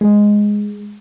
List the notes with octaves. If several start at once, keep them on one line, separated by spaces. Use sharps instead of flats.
G#3